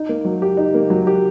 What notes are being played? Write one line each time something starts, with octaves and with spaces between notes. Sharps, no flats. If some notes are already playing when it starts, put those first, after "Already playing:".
Already playing: D#4
A#3
F#3
G4
D#4
A#3
F#3
G4